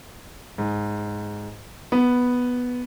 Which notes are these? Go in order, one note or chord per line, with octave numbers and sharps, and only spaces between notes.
G#2
B3